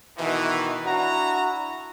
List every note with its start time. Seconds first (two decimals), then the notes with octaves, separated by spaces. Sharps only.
0.18 B2 D#3 E3
0.85 D4 E4 F#4 A#5